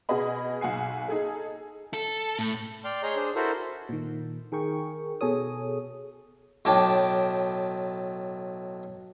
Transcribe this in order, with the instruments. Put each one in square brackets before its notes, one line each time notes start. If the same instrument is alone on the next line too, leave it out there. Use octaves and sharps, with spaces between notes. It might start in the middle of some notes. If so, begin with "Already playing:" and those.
[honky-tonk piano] B2 F#4 G#4 B4 D#5 B5
B1 F#5 G#5 C7
D#4 G#4 A4
[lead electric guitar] A4
A2
[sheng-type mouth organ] D5 G5 C6 F6
G#4 C#5 D#5 A#5 C6 G6
D4 G#4 C5
E4 F#4 A4 A#4 C5
[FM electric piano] A#2 D#3
D#3 G#4 A#4 G5 C#6
B2 G#4 A4 C#5 D#6
[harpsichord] B1 A2 G5 A5 D6